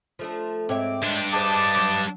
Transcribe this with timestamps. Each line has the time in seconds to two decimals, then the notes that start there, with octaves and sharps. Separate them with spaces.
0.19 F3 A3 D4
0.69 G#2 C4 C#5 E5 D6
1.03 G2 G#3 D4
1.33 G#4 B4 C5 D#5 A5 D6
1.76 F#3